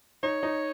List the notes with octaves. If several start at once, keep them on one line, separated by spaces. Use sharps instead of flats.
D#4 C#5
D#4